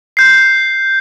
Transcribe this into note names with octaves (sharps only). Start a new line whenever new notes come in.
G6 C7